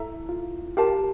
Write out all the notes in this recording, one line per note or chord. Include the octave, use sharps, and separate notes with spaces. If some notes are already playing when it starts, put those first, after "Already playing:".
Already playing: E4 A4 E5 A#5
F4
F4 G4 A#4 F5 A5